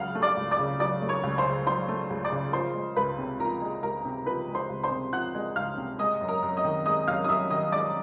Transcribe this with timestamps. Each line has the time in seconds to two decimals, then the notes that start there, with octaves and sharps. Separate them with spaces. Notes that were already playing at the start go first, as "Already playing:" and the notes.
Already playing: C#2 C#3 F#3 F5 F#5 F6
0.15 A3
0.22 D5 D6
0.37 C#2
0.51 D5 D6
0.59 C#3
0.80 F#3 D5 D6
1.02 A3
1.09 C#5 C#6
1.23 C#2
1.38 C5 C6
1.45 C#3
1.67 F#3 C5 C6
1.89 A3
2.10 C#2
2.25 D5 D6
2.32 C#3
2.53 F3 C5 C6
2.75 G#3
2.96 C#2 B4 B5
3.18 C3
3.40 F3 A#4 A#5
3.62 G#3
3.83 C#2 A#4 A#5
4.05 C3
4.26 F3 B4 B5
4.48 G#3
4.55 C5 C6
4.70 C#2
4.83 C5 C6
4.91 C3
5.13 F3 F#5 F#6
5.35 G#3
5.56 C#2 F5 F6
5.77 C3
5.99 G#3 D#5 D#6
6.21 F#2
6.28 A#4 A#5
6.43 F#2
6.57 D#5 D#6
6.64 D#3
6.86 G#3 D#5 D#6
7.07 F#2 F5 F6
7.24 D#6
7.29 F#2 E5 E6
7.50 D#3 D#5 D#6
7.72 G#3 D5 D6